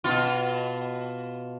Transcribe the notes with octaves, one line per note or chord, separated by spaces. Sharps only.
B2 F4